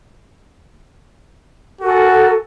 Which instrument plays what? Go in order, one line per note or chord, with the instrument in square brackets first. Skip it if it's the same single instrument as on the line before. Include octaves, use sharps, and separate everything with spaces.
[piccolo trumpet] F#4 [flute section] A4 A#4 G#5